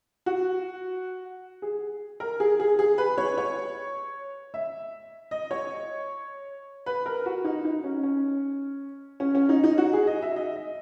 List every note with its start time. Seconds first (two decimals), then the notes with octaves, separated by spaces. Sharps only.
0.26 F#4
1.62 G#4
2.20 A#4
2.40 G#4
2.60 G#4
2.79 G#4
2.98 B4
3.18 C#5
3.38 C#5
4.54 E5
5.31 D#5
5.51 C#5
6.86 B4
7.06 A#4
7.26 F#4
7.44 D#4
7.65 D#4
7.84 C#4
8.03 C#4
9.20 C#4
9.35 C#4
9.49 D#4
9.64 D#4
9.78 F#4
9.93 G#4
10.07 D#5
10.22 E5
10.36 D#5
10.56 D#5